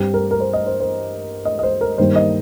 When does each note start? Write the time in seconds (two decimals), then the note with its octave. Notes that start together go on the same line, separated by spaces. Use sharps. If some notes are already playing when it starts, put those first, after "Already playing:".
Already playing: G2 G3 C4 G4
0.14 A#4
0.31 A#4
0.40 C5
0.53 D#5
0.67 C5
0.80 C5
1.45 D#5
1.59 D#5
1.63 C5
1.81 A#4
1.98 G2 D#3 G3 A#3 C5
2.16 D#5